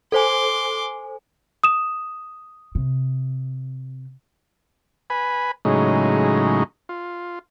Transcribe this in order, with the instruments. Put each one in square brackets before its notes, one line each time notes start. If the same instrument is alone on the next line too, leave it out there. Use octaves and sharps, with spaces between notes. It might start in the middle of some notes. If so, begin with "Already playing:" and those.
[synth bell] A4 C5 G#5 [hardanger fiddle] C6 D6
[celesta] D#6 E7
[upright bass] C3
[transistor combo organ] B4 G#5 B5
A2 C#3 F#3 G#3 D#4
F4